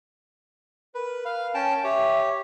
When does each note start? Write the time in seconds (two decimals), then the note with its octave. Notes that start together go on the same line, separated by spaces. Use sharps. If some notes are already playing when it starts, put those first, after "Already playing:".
0.95 A#4 B4
1.25 F5
1.55 C#4 G5 A5
1.84 G4 C#5 E5